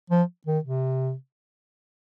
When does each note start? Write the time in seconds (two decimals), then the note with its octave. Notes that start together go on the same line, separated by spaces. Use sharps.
0.10 F3
0.46 D#3
0.64 C3